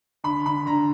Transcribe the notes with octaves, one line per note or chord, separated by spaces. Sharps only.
D3 B5
D3 B5
D3 A#5